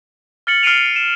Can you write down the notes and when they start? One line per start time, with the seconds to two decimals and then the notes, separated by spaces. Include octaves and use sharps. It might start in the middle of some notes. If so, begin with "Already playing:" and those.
0.47 F6 A6 C#7 F#7
0.63 F6 C7 D7 D#7 F7
0.96 E7